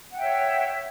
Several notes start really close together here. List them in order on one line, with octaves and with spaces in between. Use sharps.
F#5 G5 E5 C#5